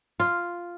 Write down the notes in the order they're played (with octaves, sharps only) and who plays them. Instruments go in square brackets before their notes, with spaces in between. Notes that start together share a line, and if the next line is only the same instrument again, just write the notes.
[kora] F4